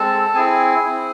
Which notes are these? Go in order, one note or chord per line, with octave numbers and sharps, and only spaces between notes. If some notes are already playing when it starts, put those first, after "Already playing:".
Already playing: G#3 C4 A4 A5
C4 E4 G#4 G#5
C4 E4